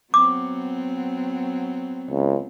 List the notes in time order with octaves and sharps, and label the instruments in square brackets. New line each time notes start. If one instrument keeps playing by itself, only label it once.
[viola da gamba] F#3 B3 C4 [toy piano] D6
[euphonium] C#2